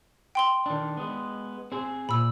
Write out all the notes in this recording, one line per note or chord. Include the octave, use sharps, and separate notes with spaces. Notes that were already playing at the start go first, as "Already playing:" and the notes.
G5 C6 G7
D#3 D4
G#3 B3
C4 G#4
A#2 B5 E6